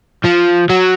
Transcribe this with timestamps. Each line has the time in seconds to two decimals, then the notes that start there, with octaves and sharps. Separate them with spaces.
0.25 F3
0.70 F#3